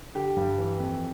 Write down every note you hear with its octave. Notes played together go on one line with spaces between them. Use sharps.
D3 G4
G2
E3
F2